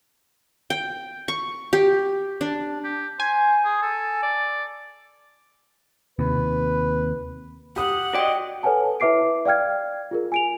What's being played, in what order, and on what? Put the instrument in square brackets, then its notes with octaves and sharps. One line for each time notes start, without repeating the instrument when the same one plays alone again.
[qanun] G5
C#6
G4
D4
[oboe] G4
[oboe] C5 [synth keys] G#5
[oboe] G#4
A4
D5
[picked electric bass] D#2 C3 [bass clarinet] B4
[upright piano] G4 D#6 [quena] F#5
[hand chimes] F#4 G5 [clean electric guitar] D5 D#5
[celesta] A4 B4 C#5 F#5 G#5 A5
E4 B4 E5 D6 C7 D7
D5 F5 G5 F6 G#6
F4 G#4 A#4
G#5 D7 F7